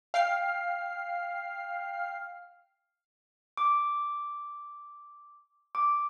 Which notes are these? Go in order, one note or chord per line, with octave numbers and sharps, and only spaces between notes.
F5 G5 F6 C7
D6
D6